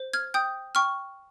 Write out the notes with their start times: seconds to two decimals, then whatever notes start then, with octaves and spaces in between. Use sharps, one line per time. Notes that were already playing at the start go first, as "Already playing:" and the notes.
Already playing: C5
0.14 F6 G#6
0.34 G5 D#6 G6
0.75 G5 C#6 F6